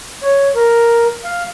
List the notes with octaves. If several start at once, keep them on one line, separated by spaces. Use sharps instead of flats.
C#5
A#4
F5